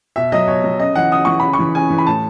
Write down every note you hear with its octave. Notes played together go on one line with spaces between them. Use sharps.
B2 E5
F#3 D#5
B2 C#5
F#3
C#3 D#5
E3 F#5
C#3 D#6
E3 C#6
C#3 B5
C#6
E3
C#3 G#5
E3
B5
A2 A5